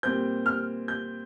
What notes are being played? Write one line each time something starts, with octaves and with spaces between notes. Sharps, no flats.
A#2 G3 C4 G6
F6
G6